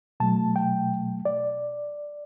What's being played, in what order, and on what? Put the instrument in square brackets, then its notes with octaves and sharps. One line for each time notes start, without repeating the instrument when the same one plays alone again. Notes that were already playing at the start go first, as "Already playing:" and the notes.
[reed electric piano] B2 F#3 A3 A5
G5
D5